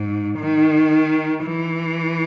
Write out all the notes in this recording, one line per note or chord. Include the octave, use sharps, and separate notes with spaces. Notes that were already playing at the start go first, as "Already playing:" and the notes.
Already playing: G#2
D#3
E3